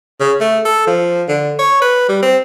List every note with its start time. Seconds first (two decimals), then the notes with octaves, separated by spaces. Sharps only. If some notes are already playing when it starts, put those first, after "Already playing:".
0.20 C#3
0.40 A3
0.65 A4
0.87 F3
1.28 D3
1.59 C#5
1.82 B4
2.09 G3
2.22 C4